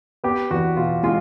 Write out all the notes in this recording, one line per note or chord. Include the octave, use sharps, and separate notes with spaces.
B3 G4
E2 F#4
B2 F4
G#3 F4